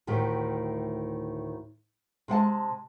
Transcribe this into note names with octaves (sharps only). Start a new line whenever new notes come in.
D2 A2 D#3 G4
C3 G#3 F#5 A5